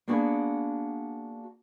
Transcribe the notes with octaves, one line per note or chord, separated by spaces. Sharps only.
A#3 B3 D4 F#4 G#4